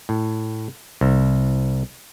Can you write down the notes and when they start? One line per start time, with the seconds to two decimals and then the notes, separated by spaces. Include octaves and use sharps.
0.09 A2
1.01 C2